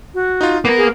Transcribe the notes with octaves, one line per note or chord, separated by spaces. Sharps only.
F#4
D#4 F4
A#3 B3 A#4
G#4